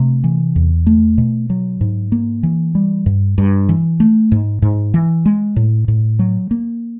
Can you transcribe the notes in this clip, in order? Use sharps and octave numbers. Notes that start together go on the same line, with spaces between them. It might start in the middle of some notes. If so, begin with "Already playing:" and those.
Already playing: C3 A3
E3
E2
A3
B2
F#3
G#2
A#3
E3
G3
G2
G2
E3
A3
G#2
G#2
E3
G#3
A2
A2
F#3
A#3